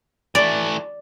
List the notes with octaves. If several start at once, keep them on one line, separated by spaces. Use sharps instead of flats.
E3 A3 D5